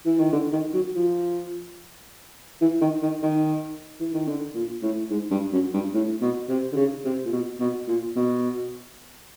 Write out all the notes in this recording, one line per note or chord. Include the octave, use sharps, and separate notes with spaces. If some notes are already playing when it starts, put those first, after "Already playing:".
E3
D#3
D3
D#3
F#3
F3
E3
D#3
D#3
D#3
E3
D#3
D3
A#2
A2
G#2
G2
F#2
G2
A2
B2
C3
D3
C#3
C3
A#2
B2
B2
A#2
B2